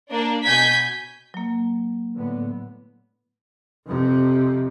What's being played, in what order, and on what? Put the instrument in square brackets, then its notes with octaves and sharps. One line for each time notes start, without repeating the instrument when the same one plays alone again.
[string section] A#3 D4
B2 G#5 G6 G#6 B6
[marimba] F#3 A#3
[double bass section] A2 D3 B3
[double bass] F2 C3